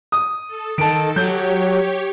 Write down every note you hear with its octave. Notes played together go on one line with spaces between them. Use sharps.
D#6
A4
D#3 A4 A5 D7
F#3 G4 C#5 G6